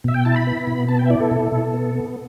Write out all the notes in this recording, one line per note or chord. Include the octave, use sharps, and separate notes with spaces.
B2 E5
G5
E4 A5
B5
B3
B2
B3 A5
G5
E5
E4 D5
A4
B2
B2
B3
B3